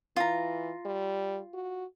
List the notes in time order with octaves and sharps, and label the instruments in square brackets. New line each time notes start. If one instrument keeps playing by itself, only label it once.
[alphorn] E3 [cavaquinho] F4 A#5
[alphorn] G3
F#4